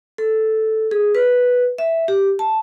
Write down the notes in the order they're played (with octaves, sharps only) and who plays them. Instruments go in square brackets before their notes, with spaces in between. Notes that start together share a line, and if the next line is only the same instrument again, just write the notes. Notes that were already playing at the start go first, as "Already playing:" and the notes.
[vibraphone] A4
G#4
B4
E5
G4
A5